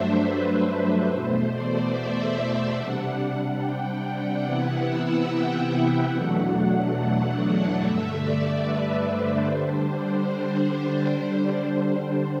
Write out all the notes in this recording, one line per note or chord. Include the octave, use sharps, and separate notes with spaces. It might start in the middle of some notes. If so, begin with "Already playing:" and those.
Already playing: G2 F#3 A3 D4 C5 E5
B4
E2 B2 A3 C5
D5
E5
C3 G3 D4 F#5
G5
C3 E3 B3 E4 F#5
E5
G5
E2 B2 F#3 A3 D4 F#5
G2 D3 A3 E5
D5
B4
C5
D3 G3 D4